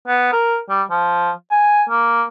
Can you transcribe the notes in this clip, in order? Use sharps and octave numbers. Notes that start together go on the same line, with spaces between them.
B3
A#4
G3
F3
G#5
A#3